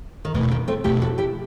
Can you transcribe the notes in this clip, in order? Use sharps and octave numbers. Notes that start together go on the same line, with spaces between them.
D#3
F#1 E2 B2 E3 A3
D#3
A3 C4
F#1 E2 B2 A3 E4 G4
F#4 A4
E4 G4